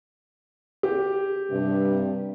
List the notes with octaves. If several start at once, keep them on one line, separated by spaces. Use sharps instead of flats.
G4
G2 C3